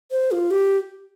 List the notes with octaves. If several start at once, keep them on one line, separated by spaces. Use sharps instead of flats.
C5
F4
G4